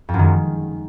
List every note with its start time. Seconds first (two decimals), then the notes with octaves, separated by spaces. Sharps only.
0.09 F2
0.14 F#2
0.19 D#3
0.24 G#3